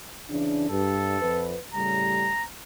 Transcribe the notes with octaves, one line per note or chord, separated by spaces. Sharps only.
C#3 E3 D4
G2 A4
F2 B4
A2 C#3 G3 A#5